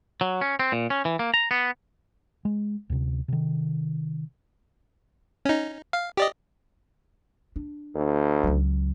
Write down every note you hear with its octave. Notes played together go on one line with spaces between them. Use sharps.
F#3
C#4
C4
A#2
C#4
E3
A#3
A#5
B3
G#3
D2 C3
C3 D#3
C#4 D#4
F5
G4 D5 D#5
D4
D2
C#2 F#3